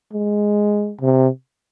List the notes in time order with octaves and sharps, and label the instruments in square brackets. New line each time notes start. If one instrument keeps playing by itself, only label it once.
[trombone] G#3
C3